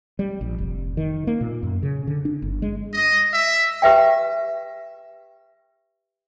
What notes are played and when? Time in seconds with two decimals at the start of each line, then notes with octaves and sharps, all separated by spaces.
0.19 G3
0.41 A#1
0.58 F1
0.97 D#3
1.27 A#3
1.41 A#2
1.63 F#2
1.83 C#3
2.07 D3
2.25 D4
2.42 G1
2.62 G#3
2.94 D#5
3.33 E5
3.82 G4 B4 E5 G5